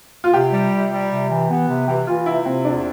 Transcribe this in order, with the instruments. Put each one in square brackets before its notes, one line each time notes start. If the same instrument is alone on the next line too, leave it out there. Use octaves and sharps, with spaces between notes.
[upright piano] F4
[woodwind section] C3 [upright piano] G4
[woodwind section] G3
C3
G3
C3
E3
B3
C3
[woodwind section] E3 [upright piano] G4
[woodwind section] E3 [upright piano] F4
[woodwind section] C3 [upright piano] E4
[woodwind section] C3 [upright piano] C4
[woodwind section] E2 [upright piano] D4